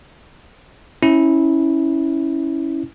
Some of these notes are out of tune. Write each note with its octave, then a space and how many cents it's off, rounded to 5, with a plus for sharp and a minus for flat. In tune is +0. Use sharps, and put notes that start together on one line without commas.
C#4 +0 E4 -15